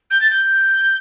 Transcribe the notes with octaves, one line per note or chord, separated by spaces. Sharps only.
G6
A6
G6